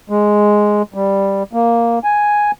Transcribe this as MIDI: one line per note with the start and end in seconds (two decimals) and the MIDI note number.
0.10 0.82 56
0.94 1.43 55
1.53 1.99 58
2.04 2.51 80